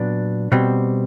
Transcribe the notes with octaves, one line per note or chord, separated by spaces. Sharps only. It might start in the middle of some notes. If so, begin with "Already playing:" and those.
Already playing: A#2 F#3 B3 D4
B2 G3 C4